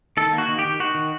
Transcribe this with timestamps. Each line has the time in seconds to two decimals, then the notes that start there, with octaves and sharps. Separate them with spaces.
0.17 D#3 A4
0.33 A#3
0.38 F#4
0.49 D#3
0.59 G4
0.65 D#3
0.80 D#3 F#4
0.95 D#3